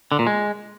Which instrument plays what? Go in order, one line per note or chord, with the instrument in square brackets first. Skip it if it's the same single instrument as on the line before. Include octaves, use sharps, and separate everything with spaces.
[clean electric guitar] D3
A#2
G#3